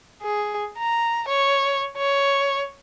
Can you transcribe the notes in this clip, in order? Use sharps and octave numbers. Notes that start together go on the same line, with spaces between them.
G#4
A#5
C#5
C#5